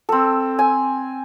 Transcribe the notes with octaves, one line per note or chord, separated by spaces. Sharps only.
C4 A4
G#5